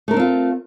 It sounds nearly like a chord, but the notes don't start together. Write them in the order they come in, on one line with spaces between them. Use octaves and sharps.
A3 A#4 D4 C4 F4